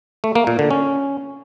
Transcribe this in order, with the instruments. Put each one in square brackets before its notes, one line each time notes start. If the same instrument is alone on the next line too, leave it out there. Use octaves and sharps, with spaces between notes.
[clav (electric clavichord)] A3
A#3
A#2
D3
C#4